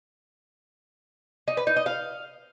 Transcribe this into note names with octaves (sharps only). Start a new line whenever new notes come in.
D#4
B4
D#4
D#5
F5